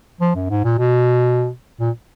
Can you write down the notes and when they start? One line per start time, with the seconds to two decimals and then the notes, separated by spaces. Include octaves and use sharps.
0.21 F3
0.35 F#2
0.50 G#2
0.64 A#2
0.79 B2
1.80 A#2